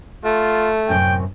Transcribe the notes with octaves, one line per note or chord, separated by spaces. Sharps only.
A3 F4
F#2 A2 C3 G5